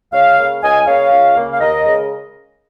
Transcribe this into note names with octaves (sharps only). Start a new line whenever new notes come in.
C#2 C#5 F5
C#3 A#3
C#2 D#5 G#5
C#3 A#3 C#5 F5
C#2
C#3 A#3
F5
D#2 A#4 D#5
C#3 G#3